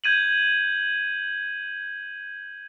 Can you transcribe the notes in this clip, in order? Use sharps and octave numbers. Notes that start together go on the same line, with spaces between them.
G6 G#6 D#7 F#7